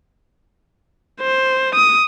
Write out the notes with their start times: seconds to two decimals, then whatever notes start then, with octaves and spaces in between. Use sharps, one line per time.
1.21 C5
1.75 D#6